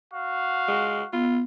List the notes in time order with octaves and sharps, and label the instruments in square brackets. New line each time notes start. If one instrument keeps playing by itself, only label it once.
[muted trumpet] F#4 [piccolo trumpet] F5
[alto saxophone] G#3
[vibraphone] B3 [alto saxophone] F4